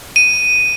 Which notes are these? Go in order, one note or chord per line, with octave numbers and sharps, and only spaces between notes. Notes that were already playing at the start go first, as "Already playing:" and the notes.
D#7